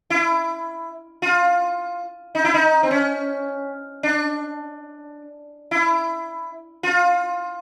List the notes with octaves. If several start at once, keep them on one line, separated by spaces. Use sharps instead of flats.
E4
F4
D#4
E4
D#4
C4
C#4
D4
E4
F4